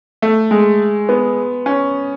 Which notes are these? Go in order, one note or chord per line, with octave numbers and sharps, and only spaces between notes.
A3
G#3
B3
C#4